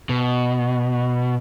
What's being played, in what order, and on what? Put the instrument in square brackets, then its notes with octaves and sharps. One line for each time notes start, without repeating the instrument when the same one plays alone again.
[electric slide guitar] B2